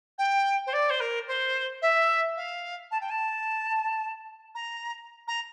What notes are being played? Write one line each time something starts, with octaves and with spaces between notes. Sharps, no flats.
G5
C5
D5
C5
A#4
C5
E5
F5
A5
G5
A5
A#5
A#5